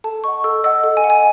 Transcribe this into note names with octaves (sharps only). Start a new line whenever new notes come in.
A4 A5
D#5 F#5 C#6
A4 E6
D#5 F#5 E6
A4
G#5
D#5 F#5
G#5